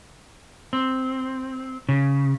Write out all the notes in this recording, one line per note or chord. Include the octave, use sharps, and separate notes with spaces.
C4
C#3